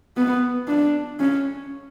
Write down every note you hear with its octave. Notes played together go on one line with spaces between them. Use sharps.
B3
D4
C#4